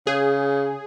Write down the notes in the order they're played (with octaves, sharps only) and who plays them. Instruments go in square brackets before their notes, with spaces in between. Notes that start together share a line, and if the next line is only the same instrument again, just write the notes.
[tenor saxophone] C#3 [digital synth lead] G#4